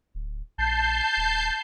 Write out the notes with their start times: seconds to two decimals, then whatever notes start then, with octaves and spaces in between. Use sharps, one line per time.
0.15 D1
0.58 A#1 A5 G6 C7
1.17 D#1